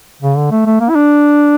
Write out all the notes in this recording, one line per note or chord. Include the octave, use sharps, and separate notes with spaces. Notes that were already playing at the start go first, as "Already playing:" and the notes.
C#3
D3
A3
A3
A#3
E4
D4